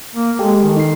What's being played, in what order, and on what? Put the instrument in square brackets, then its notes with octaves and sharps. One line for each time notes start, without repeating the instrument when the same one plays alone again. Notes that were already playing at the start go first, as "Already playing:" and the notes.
[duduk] A#3
[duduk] G#3 [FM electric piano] G4 A4
[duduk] D#3
[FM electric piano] D#4 C7